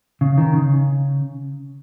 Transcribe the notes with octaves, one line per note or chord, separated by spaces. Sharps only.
C#3
D#3
C#3